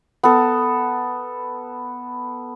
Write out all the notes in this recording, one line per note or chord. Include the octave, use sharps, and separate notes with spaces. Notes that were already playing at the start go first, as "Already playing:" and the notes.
B3 A4